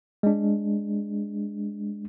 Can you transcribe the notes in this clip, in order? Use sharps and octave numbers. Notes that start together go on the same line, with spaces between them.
G#3 D4